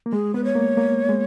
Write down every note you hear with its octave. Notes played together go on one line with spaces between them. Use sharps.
A#3
G#3 G#4
B3 B4
C#5
A#3
A#3
G#3